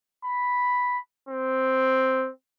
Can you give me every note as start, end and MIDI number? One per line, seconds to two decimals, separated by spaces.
0.25 0.99 83
1.29 2.30 60